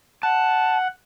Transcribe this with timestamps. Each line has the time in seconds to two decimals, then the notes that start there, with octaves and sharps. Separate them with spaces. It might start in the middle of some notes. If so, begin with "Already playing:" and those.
0.23 F#5 A5